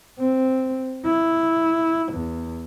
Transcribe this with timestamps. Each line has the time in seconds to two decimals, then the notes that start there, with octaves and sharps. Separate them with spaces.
0.19 C4
1.05 E4
2.12 E2